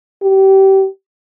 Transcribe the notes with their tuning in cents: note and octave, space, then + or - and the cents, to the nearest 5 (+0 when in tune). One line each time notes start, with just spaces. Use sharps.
G4 -25